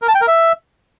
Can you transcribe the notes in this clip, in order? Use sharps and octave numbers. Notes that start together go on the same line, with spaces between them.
A#4
A5
G5
A#4
E5